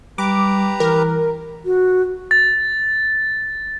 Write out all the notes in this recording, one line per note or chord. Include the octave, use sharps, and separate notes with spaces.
G3 G4 B4 A#5 D6
E3 A#4
F#4
A6